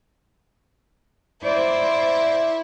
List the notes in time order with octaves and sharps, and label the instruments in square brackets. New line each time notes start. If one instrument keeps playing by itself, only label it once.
[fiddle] E4 [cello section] C5 D5